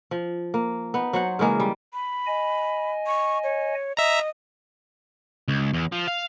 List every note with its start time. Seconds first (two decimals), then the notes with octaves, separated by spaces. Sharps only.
0.11 F3
0.54 A#3
0.94 B3 D#4
1.13 F#3 C5 F#5
1.39 C#3 E3 G#3 A#3
1.60 G3
1.93 B5
2.27 D#5 G#5
3.07 C#6
3.44 C#5
3.97 D#5 E5 A#5
5.48 C#2
5.73 E2
5.92 F3
6.07 F5